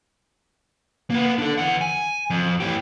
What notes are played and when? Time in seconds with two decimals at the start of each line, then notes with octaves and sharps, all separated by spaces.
1.10 A#3 B3
1.38 D4 A4
1.58 E3 F#5
1.81 G#5
2.30 F2
2.60 E3 G4